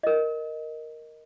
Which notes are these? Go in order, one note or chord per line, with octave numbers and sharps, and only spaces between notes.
A#4 D#5